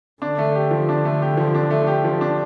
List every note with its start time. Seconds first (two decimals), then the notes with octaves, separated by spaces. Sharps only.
0.22 D3 D4
0.38 A3
0.55 G4
0.71 F3
0.89 D4
1.05 A3
1.22 G4
1.37 F3
1.55 D4
1.71 A3
1.87 G4
2.04 F3
2.21 D4